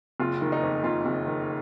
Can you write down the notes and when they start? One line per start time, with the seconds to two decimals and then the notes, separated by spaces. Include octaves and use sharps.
0.20 F#1 F4
0.41 D#3
0.52 D#4
0.63 F2
0.84 F#1 F4
1.06 F#1
1.27 D#3